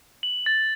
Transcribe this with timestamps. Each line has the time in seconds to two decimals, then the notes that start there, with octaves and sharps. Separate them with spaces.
0.23 F#7
0.46 A6